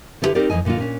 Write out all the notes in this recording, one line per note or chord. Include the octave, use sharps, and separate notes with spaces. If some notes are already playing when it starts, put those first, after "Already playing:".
D3 B3 E4 F#4 G4 B4
C4 D#4 G4 A#4 D5
F2 E3 D#5 G#5
A#2 D3 A#3 D#4 F4
A#2 C#4 D4